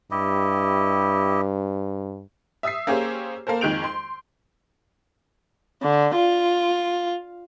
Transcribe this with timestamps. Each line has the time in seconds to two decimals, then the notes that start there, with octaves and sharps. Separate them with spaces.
0.11 G2 E4 G4 D#5
2.63 E5 D#6 E6 B6 C7
2.87 A#3 C#4 G4 G#4 C5
3.47 A#3 A4 A#4 C5
3.61 F2 D#3 G#3 G6 D7 F7
3.84 C6
5.82 D3
6.15 F4